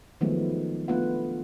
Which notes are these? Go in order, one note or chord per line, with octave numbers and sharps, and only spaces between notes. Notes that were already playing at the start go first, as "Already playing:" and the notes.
D#3 F3 F#3 G#3 A3 B3
A3 B3 D4 F4 B4 F#5